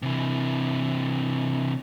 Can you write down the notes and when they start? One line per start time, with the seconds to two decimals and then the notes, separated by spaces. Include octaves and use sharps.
0.02 C3 E3